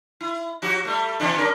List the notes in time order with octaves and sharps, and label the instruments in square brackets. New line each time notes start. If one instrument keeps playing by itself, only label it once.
[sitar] E4
F3 F#4 G4
G3 A3
B2 E3 D4
G2 C#4 A#4